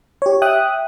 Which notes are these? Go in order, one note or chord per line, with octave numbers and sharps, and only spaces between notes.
G4 C#5
E5 G5 D#6 F#6